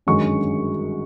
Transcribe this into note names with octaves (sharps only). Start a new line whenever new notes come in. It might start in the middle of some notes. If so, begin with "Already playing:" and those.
G1 F#2 D#3 G#3 C#4 C#6